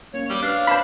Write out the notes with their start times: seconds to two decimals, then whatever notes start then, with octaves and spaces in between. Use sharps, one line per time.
0.14 A#3 C#4 C#5
0.30 G3 D6
0.42 D4 B4 C#5 F5
0.67 C5 A5 B5